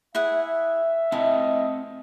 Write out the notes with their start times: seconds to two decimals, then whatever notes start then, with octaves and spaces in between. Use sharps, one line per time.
0.15 E4 G#4 E5 F#5
1.12 C4 E4 D#5 F#5 A5